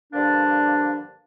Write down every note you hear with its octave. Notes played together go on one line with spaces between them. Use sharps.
G2 D3 F3 A#3 D4